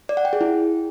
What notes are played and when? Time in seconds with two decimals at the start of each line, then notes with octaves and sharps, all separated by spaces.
0.09 D5
0.17 F#5
0.25 G5
0.33 G#4
0.41 E4